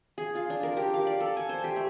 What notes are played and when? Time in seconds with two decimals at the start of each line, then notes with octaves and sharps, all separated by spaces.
0.18 G#4
0.35 F4
0.50 D4
0.63 A#4
0.77 G4
0.94 F5
1.07 D5
1.20 A4
1.37 G#5
1.49 C5
1.64 G4
1.76 A3